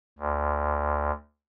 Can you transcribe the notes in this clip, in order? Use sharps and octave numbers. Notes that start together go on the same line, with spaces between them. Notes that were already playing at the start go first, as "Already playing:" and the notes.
D2